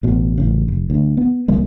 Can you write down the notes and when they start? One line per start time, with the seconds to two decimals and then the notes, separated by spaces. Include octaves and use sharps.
0.03 A1 B2
0.38 A1 C#3
0.68 F1
0.90 D2
1.17 B3
1.48 C#2 C#3 G3 A#3